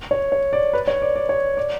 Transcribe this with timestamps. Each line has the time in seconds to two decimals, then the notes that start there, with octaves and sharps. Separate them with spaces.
0.11 C#5
0.32 C#5
0.53 D5
0.73 B4
0.87 C#5
1.02 D5
1.16 D5
1.29 C#5
1.57 D5